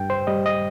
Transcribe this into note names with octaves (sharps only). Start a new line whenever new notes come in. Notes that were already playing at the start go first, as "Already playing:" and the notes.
Already playing: G2 G5
C5
G3 D#5
D#5